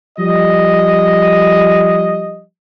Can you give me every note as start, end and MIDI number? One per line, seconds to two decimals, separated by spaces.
0.19 2.43 53
0.19 2.43 55
0.19 2.43 75